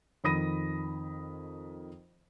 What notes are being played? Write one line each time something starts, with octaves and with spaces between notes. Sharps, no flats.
F2 D#3 B5 D#6 A#6 D#7